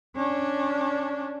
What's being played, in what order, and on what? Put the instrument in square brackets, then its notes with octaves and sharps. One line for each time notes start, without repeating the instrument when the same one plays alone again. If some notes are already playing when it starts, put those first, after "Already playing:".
[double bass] C#4 D4